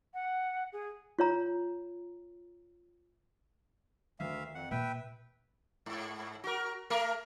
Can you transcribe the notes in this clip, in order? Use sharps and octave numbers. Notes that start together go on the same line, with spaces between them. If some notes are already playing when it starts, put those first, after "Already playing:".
F#5
G#4
F4 C#5 A#5
D2 D#3 F3 E5 F5
F2 F#5
A#2 B4 E5 G5
G#2
F#4 A#4
A3 A#4